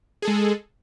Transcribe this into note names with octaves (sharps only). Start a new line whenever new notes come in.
G#3 G#4 A4